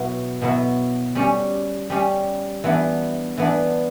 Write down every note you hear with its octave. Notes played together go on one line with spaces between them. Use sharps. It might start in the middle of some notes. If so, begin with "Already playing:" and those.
Already playing: B2 F#3 B3 E4
B2 F#3 B3 E4
G3 C#4 G4
G3 C#4 G4
E3 B3 D4
E3 B3 D4